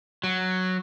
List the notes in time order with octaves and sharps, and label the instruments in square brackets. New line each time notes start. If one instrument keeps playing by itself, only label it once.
[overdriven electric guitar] F#3